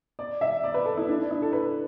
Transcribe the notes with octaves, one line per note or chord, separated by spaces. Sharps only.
D5
E5
D5
B4
A4
E4
D4
D4
E4
A4
B4